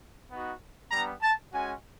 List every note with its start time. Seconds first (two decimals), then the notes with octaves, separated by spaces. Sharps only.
0.31 B3 D#4 F#4
0.91 G3 B3 D4 A#5
1.22 A5
1.53 G#3 C#4 F#4 G#5